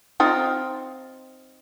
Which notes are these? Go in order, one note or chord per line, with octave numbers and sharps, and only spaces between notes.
C4 D#4 F4